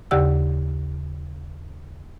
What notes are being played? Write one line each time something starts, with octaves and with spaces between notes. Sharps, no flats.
D#2 C#3 G4 D5 F#5 E6